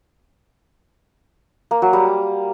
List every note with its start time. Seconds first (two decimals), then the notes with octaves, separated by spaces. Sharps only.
1.71 A#3
1.82 F#3
1.93 G3